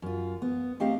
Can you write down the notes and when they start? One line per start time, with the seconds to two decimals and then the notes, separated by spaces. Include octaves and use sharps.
0.02 F#2 F4
0.42 B3
0.80 A3 C4 G4 D#5 F5